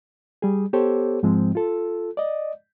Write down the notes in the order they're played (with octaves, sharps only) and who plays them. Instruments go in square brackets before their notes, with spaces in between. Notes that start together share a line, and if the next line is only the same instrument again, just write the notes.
[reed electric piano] G3 G#4
B3 G4 A4 C5 C#5
G#2 F3 G#3 C4
F4 A4
D5 D#5